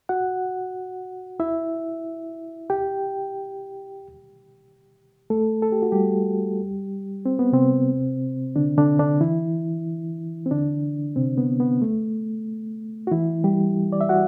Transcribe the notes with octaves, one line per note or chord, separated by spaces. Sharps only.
F#4 F#5
E4 E5
G4 G5
A3 A4
A4
G4
F#4
G3 G4
C4
B3
C3 C4
D3 D4
D3 D4
D3 D4
E3 E4
C4
D3 D4
C3 C4
B3
B3
A3
F#4
E3 E4
G3 G4
D5
E5
F#4 F#5